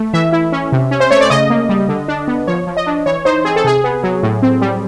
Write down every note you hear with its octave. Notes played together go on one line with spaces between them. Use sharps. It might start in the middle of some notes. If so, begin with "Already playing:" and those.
Already playing: A3
E3 E5
E4
C#4
C3
C#4
C5
A3 C#5
D5
C#3 D#5
A#3
G3
D3
D4
B3
F3 C#5
F3
D#5
D4
E3 C#5
D#4 C5
C4 G#4
A4
C3 G#4
B3
F#3
A2
C4
G3